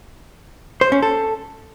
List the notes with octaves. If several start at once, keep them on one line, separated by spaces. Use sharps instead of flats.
C5
C#4
A4